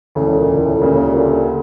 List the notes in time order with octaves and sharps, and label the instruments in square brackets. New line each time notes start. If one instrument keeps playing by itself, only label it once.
[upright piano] E1 D2 C#3 [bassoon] A2
[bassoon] A#2
A2
[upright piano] D2 C#3 G3 A#3 C#4 [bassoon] A#2
[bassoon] D3